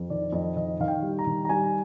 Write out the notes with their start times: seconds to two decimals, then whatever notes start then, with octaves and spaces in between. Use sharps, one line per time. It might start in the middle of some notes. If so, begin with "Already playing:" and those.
Already playing: F2
0.10 D#3 D5
0.32 F2 D#5
0.56 D#3 D#5
0.80 D#3 F5
0.88 G5
1.02 G3
1.19 A#5
1.27 D#3
1.45 A#5
1.49 G3 G#5